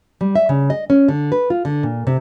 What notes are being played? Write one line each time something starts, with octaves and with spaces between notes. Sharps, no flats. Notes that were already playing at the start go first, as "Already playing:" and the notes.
G3
E5
C#3
D#5
C#4
D3
B4
F4
D3
A#2
C3